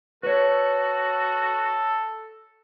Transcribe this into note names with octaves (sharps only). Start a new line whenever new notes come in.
F#4 A4 B4 C#5